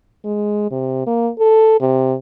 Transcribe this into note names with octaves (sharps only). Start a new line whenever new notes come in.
G#3
C3
A#3
A4
C3